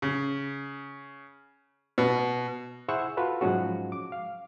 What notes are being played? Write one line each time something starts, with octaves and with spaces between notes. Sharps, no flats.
C#3
B2
E4 G#4 C5 F#5 C#6 E6
F4 F#4 A4 B4
G#2 F3 F#3 G#3 C#4 F#4
D6
F5